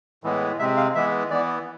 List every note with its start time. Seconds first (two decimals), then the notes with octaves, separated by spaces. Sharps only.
0.24 A2 E3 G#3 B3
0.59 C3 G#3 C4 E5
0.77 F5
0.95 E3 G#3 B3 E5
1.30 E3 B3 D5